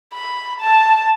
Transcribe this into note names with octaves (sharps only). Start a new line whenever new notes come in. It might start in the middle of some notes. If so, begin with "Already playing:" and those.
B5
A5